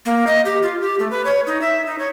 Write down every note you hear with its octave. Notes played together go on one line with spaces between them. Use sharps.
A#3
D#5
G4
F4
G4
A3
B4
C#5
D#4
E5
D#4
C#5